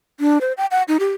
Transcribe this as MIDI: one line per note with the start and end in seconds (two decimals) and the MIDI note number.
0.20 0.38 62
0.41 0.53 72
0.57 0.66 79
0.71 0.83 78
0.88 0.97 63
1.00 1.15 67